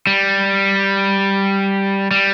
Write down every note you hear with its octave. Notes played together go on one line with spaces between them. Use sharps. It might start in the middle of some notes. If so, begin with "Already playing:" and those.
G3
G3